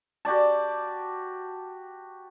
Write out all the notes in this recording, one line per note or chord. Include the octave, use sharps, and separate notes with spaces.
F#4 G4 D5 A5